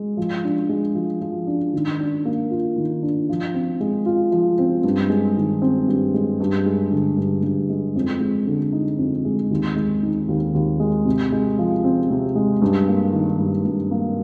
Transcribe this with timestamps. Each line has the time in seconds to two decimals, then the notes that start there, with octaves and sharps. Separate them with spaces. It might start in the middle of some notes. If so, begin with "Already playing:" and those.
Already playing: G#3
0.17 F3
0.44 D4
0.69 G#3
0.95 F3
1.21 F3
1.47 D4
1.74 D#3
2.00 D4
2.25 A#3
2.51 F4
2.76 D#3
3.02 D4
3.29 F3
3.54 C4
3.80 G#3
4.06 F4
4.32 F3
4.59 C4
4.84 G2
5.10 G#3
5.37 D#3
5.62 C4
5.88 G2
6.14 G#3
6.40 G2
6.66 G#3
6.91 D3
7.17 G2
7.43 G2
7.70 G#3
7.95 F2
8.20 G#3
8.47 D3
8.73 D#4
8.98 F2
9.25 G#3
9.51 D#2
9.76 G#3
10.03 D#3
10.28 D#2
10.54 D#2
10.80 G#3
11.05 C3
11.32 G#3
11.58 F3
11.84 C4
12.10 C3
12.36 G#3
12.62 G2
12.88 A#3
13.13 D#3
13.39 G2
13.65 G2
13.91 A#3